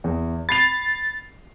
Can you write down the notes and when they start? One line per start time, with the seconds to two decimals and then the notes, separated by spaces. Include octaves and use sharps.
0.04 E2
0.49 B5 A6 C7 F7